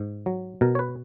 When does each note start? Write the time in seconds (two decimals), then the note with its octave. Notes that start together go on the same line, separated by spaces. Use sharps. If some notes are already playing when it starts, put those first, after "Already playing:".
Already playing: G#2
0.26 F#3
0.61 B2 A#4
0.75 C#5
0.79 B4